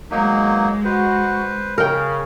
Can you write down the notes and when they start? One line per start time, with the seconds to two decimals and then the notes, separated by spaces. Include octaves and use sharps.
0.11 E2 D#3 F#3 G#3 A#3 D#4
0.84 F#4 B4 C5
1.78 C#3 A#4 G5